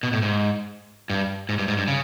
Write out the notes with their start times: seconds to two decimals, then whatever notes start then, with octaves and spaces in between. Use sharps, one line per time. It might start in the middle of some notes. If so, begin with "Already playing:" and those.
0.03 B2
0.13 A2
0.22 G#2
1.10 G2
1.49 G#2
1.59 G2
1.68 G#2
1.78 G2
1.88 C#3